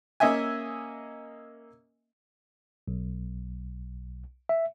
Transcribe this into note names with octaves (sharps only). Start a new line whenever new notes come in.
A#3 C#4 D#5 E5 G#5
B1
E5